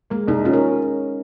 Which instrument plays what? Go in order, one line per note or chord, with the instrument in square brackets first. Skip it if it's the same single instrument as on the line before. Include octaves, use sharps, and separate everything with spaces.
[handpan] G#3 [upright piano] A#3
[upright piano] C2 [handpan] D#4
[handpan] C#4 [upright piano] F4
[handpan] A#4